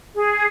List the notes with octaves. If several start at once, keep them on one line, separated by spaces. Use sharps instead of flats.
G#4